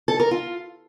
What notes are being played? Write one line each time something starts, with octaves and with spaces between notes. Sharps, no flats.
A4
A#4
F4